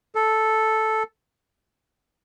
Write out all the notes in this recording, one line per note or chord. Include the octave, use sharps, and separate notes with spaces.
A4